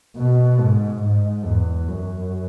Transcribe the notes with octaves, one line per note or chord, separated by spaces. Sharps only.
B2
G#2
G#2
E2
F#2